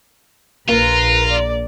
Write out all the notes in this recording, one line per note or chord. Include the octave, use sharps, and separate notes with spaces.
A#1 A#3 F4 B4 A#5
D5